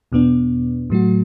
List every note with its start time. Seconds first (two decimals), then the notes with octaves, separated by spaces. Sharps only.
0.12 E2 B2 B3 D4
0.90 A2 F#3 A3 F#4